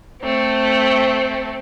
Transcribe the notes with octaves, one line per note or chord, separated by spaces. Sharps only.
A3 C4